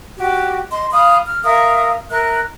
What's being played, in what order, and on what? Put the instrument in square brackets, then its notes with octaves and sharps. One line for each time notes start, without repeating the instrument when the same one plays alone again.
[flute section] F#4 G4
D#5 C6
F5 B5 D#6
F6
A#4 E5 F5 D#6
A#4 E5 F#6